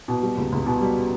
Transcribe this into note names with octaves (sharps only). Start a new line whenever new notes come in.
B2
G3
C#2
C#2
B2
G3